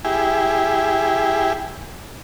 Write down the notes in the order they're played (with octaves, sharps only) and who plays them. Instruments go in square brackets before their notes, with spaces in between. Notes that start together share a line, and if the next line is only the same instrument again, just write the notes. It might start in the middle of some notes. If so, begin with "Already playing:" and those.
[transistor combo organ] E4 G4 G#4